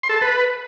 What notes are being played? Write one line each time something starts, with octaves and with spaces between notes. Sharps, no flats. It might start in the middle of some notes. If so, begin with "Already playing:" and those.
C6
A4
A5
B4